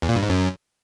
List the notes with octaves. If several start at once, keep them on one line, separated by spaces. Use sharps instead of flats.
E2
A#2
G2
G#2
F#2